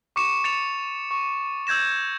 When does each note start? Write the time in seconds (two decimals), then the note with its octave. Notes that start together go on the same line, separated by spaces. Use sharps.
0.16 C#6 D6 C#7 E7
0.44 A6 C#7 F7
1.11 C#6
1.67 E6 G6 G#6 A#6 E7